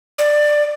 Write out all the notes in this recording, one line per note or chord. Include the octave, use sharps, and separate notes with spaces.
D5